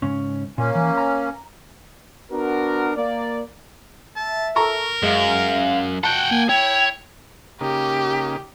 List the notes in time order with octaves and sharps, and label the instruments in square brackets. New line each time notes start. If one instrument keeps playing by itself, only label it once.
[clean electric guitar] G#2 C#3 C#4
[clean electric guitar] A#2 [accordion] A#3 C#4
[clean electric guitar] E3
A#5
[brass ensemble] B3 D4 F#4 A#4
A#3 D5
[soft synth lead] E5 [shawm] A5
[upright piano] A4 A#5 C#6 [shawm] A#4
[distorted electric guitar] F#2 [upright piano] G#3 [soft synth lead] F5
[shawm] F#4 [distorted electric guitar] F#5 G5 [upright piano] A5 [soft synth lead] F#6
[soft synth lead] A#3 [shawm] G#5
[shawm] E4 [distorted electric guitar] C#5 [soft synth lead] G5
[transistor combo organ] C#3 A#3 D#4 [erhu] G4